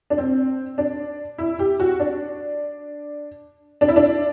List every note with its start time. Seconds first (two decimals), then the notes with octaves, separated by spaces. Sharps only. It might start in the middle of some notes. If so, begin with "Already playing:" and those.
0.10 D4
0.18 C4
0.78 D4
1.38 E4
1.59 G4
1.80 F#4
2.00 D4
3.81 D4
3.88 E4
3.96 D4